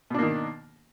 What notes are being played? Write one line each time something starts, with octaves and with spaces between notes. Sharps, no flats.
B2 D#3 A#3 D4